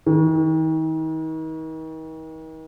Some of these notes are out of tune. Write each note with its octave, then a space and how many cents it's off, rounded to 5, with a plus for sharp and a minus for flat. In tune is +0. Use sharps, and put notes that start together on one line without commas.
D#3 +40